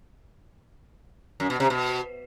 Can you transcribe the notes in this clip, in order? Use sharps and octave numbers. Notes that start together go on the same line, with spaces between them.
F#2
B2
C3
B2